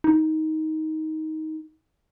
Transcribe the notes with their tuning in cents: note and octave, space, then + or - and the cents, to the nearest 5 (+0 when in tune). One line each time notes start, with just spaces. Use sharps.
D#4 +15